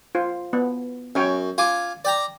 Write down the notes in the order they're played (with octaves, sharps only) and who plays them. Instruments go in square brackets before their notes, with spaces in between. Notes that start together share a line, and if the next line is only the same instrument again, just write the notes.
[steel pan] F4 C5
B3
[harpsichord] F#2 [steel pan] C#4 C#5 G5
[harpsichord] F4 G#5 D6
D5 G5 A#5